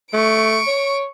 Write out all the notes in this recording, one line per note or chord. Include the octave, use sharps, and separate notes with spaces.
A3 C#6 D7
C#5